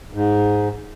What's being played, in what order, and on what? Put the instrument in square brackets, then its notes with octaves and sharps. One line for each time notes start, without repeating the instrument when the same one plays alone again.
[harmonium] G#2